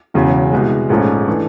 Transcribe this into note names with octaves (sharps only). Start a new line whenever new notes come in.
E1 E2 C#3 F#3
C2 B2 G#3
A#1 G#2 F3 A3 C#4
E3 A3 D4